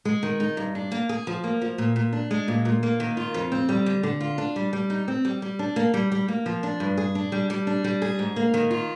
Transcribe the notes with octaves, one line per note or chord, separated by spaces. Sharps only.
G#3
D#3
D#4
G2
D4
A#3
G#4
F3
A#3
F3
A#2
A#2
D4
G#3
A#2
A#2
A#3
D#3
F4
F2
C4
G3
D3
D3
F4
D4
G3
G3
D#4
C4
G3
G3
D4
A#3
G3
G3
A#3
F3
D4
G2
G#4
D4
G3
G3
D4
G3
G#4
G#2
A#3
D#3
F4